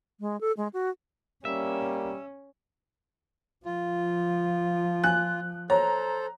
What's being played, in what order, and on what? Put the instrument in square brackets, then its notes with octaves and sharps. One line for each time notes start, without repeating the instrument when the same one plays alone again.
[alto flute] G#3
A4
G#3
F#4
[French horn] G3 [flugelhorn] A#3 [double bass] C#4 [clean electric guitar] E5
[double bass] F3 [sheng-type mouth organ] F4
[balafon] G#5 [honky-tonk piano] F#6
[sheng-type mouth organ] A4 C5 [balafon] C#5 [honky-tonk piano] A#5